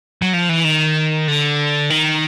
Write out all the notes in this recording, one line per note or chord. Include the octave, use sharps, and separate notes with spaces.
F#3
F3
E3
D#3
D3
D#3